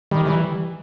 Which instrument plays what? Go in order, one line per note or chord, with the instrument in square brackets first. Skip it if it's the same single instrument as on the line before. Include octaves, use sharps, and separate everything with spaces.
[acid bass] D#3 [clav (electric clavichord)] G3
[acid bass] E3